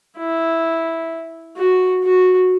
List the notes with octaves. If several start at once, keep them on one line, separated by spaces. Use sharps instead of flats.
E4
F#4
F#4